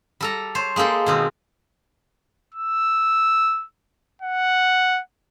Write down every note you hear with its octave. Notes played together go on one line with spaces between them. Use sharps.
G3 A4 A#5
C5 C#5
G#3 A#3 G4 A4 G5
B2 D#3 C4
E6
F#5